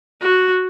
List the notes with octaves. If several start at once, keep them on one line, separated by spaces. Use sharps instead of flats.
F#4